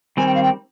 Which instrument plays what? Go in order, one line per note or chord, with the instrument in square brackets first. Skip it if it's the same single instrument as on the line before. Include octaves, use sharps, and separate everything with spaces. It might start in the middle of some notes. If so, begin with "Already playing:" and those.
[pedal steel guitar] D#3 G3 C4 [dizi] G#5
[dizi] G5
F5
G5